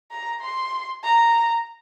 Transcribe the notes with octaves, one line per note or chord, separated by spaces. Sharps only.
A#5
C6
A#5